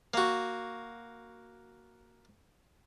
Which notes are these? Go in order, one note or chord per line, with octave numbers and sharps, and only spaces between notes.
A#3 F#4